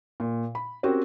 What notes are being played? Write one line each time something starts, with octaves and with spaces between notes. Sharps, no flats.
A#2
B5
C4 C#4 F#4 G4 A#4 C5